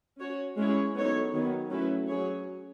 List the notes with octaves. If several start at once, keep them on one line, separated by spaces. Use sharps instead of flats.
C#4 F#4 C#5
G#3 C#4 E4 G#4 C#5
F#3 B3 D#4 A4 C#5
D#3 F#3 B3
F#3 A3 C#4 E4 B4
F#3 C#4 G#4 C#5